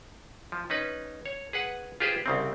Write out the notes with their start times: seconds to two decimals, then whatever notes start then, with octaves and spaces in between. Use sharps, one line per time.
0.52 F3
0.70 C#4 D#4 B4
1.26 C#5
1.53 G#4 B4 F#5
2.00 F4 G4 G#4 B4 C5
2.26 C2 C#3 C4